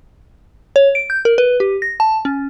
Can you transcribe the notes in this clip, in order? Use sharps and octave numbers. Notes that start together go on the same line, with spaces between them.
C#5
D7
G6
A#4
B4
G4
A#6
A5
C#4